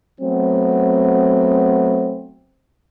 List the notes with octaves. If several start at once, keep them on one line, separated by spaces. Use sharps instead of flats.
F#3 A3 B3 C4